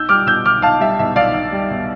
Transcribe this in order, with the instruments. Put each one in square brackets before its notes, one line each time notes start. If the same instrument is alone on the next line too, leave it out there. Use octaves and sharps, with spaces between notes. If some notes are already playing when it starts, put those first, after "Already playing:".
Already playing: [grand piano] B1 E6 G6
G3 D6 F6
B2 E6 G6
B1 D6 F6
B1 F5 A5
G3 E5
B2 E5
B1 D5 F5
B1
G3
B2